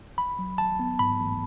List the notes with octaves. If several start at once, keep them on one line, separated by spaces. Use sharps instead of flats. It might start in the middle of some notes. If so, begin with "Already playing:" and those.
A1 B5
F#3
A1 A5
B3
G#2 B5
A1